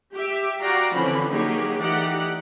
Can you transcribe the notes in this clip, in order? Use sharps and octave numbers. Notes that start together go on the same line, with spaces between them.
G4 E5
F#4 D5 F5 G5 A#5
D3 E3 F3 C4 C#4 B5
F#3 A#3 D#4 G4 G#4
E3 A3 D#4 G4 D5 F#5